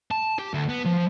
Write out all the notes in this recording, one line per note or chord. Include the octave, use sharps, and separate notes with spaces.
A5
G4
D2
B3
F3